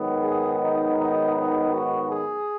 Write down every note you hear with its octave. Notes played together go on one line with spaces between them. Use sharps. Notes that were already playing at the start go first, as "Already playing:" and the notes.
Already playing: G#2 D#3 F#3 B3
G#4
D#4
D#4
D#4
F#4
G#4